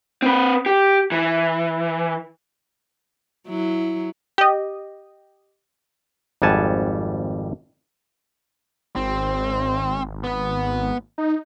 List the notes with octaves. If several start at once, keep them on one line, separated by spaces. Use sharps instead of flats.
C4 B4
G4
E3
F#3 E4
G4 D#5
G#1 F2 G3 F#5 G#5 A5
G#1 C4
B3 B4
D#4